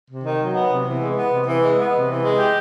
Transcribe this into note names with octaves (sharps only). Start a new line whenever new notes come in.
C3
D#3
F#3
B3
C3
E3
G#3
B3
C3
E3
G#3
B3
C3
E3
G#3
G4